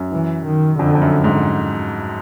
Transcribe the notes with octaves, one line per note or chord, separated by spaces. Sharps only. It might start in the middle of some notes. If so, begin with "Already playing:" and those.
Already playing: F#2
E3
D#3
F2 D3
F2
F#2
G#2